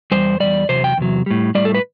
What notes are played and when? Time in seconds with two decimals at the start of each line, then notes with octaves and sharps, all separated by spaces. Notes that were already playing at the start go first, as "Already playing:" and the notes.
0.12 E2 C3 G3 C5
0.40 E2 C3 G3 D5
0.69 E2 C3 F#3 C5
0.84 G5
0.97 E2 C3 F#3
1.26 A2 G3
1.55 A2 G3 D5
1.65 A4
1.75 B4